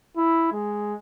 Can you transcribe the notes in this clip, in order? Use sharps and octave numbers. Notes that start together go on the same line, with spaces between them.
E4
G#3